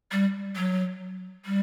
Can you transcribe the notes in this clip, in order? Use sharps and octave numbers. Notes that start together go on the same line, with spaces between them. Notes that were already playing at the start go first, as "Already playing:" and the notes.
G3
F#3
G3